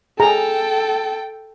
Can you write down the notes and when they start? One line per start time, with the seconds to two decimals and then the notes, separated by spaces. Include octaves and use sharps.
0.20 G#4 A4 G5 A#5